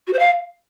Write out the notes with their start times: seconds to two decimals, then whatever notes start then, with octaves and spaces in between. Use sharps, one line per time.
0.07 F#4
0.13 C5
0.19 F5